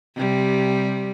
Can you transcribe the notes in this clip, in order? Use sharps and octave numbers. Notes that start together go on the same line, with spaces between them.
C3 G3